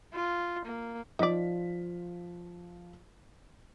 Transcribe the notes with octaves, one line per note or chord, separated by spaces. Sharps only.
F4
A#3
F3 D#4 F4 D5 B6